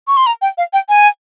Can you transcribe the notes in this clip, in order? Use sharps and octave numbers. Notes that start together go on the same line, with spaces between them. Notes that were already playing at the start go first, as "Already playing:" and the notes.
C#6
C6
A#5
G5
F5
G5
G#5